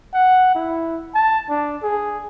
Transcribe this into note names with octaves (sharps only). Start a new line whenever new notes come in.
F#5
E4
A5
D4
G#4